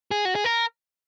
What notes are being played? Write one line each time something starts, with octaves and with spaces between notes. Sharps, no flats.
G#4
F#4
G#4
A#4